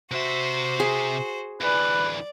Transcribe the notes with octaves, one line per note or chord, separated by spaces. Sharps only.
C3 F#4 C5 E5
G#4
D2 E3 B4 D5